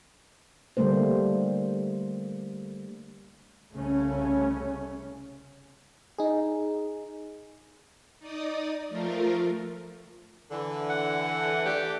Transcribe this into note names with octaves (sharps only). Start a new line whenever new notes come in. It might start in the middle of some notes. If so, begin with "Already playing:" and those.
D3 G3 A3 A#3 C5
C2 C#3 A3 C#4
D#4 G#4
D#4 D5 D#6
F3 A3 F4 A#4
D3 E3
F#5
A3 D4 G4